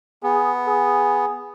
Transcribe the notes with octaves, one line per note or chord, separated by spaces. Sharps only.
B3 G#4
G#4